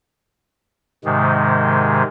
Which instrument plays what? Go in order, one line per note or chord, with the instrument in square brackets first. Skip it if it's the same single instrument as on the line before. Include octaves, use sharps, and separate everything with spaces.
[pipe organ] G#2 C3 D#3 G#3